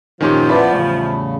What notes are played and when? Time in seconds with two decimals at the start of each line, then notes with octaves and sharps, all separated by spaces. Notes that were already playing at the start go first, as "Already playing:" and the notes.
0.21 F#2 A#2 D#3 F3 F#3 C#4 G4
0.49 B3 E4 D5 E5 A5 B5
0.73 E2 A2 C#3 G3